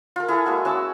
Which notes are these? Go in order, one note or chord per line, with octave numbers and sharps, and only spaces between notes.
F4 A#4
E4 G#4 A4
G#3 A#3 F#4
C#4 F#4 A5 E6